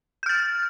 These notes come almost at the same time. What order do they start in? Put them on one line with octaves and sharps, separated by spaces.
G6 F6 A6